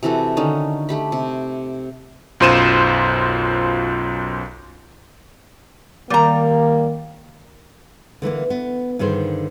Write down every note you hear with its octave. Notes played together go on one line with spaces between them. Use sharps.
C3 E3 F#4 A4
D3 D#3 C#4 D#4
A3 G4 B5
C3
B1 F#2 F4 C5 D#7 E7
D#3 G3 A#3 A#5
D3 E3 G#3 A#3
B3
G2 D3 D#3 G#4 C5